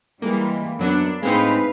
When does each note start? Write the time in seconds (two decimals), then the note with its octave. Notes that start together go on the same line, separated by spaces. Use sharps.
0.22 E3 G3 G#3 A#3
0.79 F#2 F#3 B3 D4
1.23 A2 G#3 C4 D#4 B4 F5